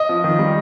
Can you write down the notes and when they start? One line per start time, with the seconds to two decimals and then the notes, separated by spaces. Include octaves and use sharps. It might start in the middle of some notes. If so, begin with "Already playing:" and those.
Already playing: D#5
0.09 F3
0.24 D#3
0.39 G3